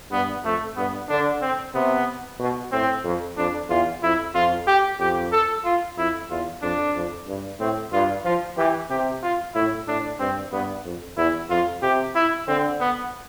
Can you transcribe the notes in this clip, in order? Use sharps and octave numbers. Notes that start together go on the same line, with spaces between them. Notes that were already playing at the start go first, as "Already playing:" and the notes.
G2 B3
F2 A3
G2 B3
D3 D4
C4
C3 B3
B2
A2 C4
F2
F2 D4
E2 F4
F2 E4
F2 F4
G4
F2 G4
A4
F4
F2 E4
E2 F4
F2 D4
F2
G2
A2 C4
G2 F4
F3 F4
E3 G4
C3 G4
F4
A2 E4
A2 D4
G2 C4
G2 B3
F2
E2 E4
F2 F4
C3 G4
E4
D3 C4
B3